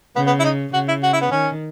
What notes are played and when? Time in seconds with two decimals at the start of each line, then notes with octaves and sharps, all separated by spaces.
0.16 C#3 B3
0.26 B3
0.40 E4
0.44 D#4
0.73 C#3 F#4
0.88 E4
1.03 F#4
1.13 E4
1.21 B3
1.31 D#3 C#4